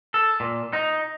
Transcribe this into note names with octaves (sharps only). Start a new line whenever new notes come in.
A4
A#2
D#4